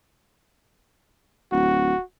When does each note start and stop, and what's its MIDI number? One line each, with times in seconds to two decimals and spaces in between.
1.52 1.92 26
1.52 2.02 66